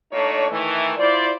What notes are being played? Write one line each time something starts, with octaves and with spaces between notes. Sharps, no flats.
A#2 A3 D4 D#4 C#5
D#3 E3 A3
E4 F4 C5 D5